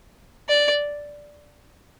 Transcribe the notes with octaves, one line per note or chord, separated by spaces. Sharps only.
D5